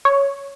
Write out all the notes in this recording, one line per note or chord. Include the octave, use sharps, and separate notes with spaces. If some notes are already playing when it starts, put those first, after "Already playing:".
C#5